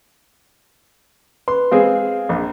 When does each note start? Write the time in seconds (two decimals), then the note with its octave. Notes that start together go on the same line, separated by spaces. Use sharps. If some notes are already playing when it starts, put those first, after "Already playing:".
1.48 B4 C6
1.72 G#3 C4 G#4 F5
2.29 A#1